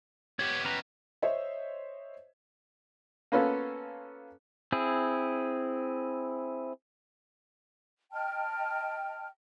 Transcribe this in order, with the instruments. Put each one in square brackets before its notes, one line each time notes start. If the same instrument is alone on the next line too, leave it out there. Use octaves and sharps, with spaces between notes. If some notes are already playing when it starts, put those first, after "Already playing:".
[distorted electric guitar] B3 G4 [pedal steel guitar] C#5
[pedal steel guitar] C#4 B4 A#5
[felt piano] C5 C#5 D#5 E5
[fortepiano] A#3 B3 C#4 F4 A4
[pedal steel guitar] C4 E4 G#4
[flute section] D#5 G5 A5 F6